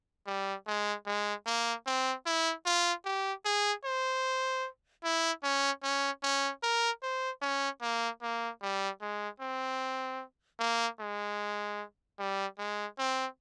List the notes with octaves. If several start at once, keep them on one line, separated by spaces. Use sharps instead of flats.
G3
G#3
G#3
A#3
C4
E4
F4
G4
G#4
C5
E4
C#4
C#4
C#4
A#4
C5
C#4
A#3
A#3
G3
G#3
C4
A#3
G#3
G3
G#3
C4